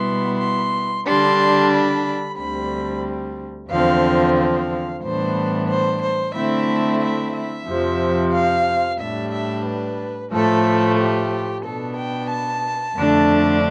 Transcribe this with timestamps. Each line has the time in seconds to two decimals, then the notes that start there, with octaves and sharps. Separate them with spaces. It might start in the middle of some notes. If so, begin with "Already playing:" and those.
Already playing: B2 G3 B3 E4 C6
0.40 C6
1.06 D3 G3 D4 C6
1.72 B5
2.38 D2 D3 G3 C4 B5
3.70 E2 D3 F3 C4 F5
4.37 F5
5.03 A2 E3 G3 B3 D4 C5
5.69 C5
6.03 C5
6.35 D3 A3 C4 E4 E5
7.02 E5
7.35 E5
7.67 F2 C3 F3
8.33 F5
9.00 A2 G3 D4 E5
9.32 E5
9.66 B4
10.31 A2 F3 A3 A4
10.98 G4
11.64 B2 B3 D4 A4
11.97 G5
12.31 A5
12.97 F2 D3 A3 D4